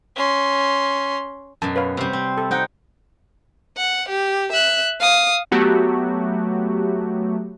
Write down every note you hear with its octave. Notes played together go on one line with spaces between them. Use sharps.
C#4 C6
F#2 B2 A5
B4 C#5 F5
C3 G3
C4
A4
C4 D#4 F#5 G5
F#5
G4
E5 F#6
F5 D#6
F#3 A3 B3 F#4 G4